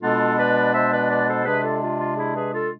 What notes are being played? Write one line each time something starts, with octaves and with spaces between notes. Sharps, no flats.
B2 G#3 B3 D4 F4 A4
B4 D5
C5 E5
B4 D5
B4 D5
A4 C5
C3 G#3 D4 G#4 B4
F4 A4
F4
F4
E4 G#4
G#4 B4
F4 A4